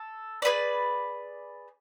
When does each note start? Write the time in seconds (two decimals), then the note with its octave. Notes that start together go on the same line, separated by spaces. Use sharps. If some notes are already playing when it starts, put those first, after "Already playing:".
Already playing: A4
0.42 G#4 B4 D5